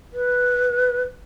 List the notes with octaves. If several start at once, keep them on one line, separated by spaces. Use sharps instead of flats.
B4